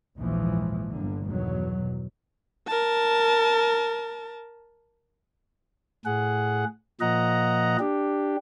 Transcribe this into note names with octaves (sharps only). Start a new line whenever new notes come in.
A#1 D#2 G#2 E3 F3 G#3
G1 D3 A#3
E2 B2 D#3 F#3
A#4 A5
A2 G#4 F#5
A#2 F3 D#5 F#5 A#5
D4 G4